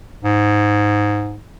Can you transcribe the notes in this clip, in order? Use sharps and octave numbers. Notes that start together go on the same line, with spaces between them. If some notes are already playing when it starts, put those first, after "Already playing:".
G#2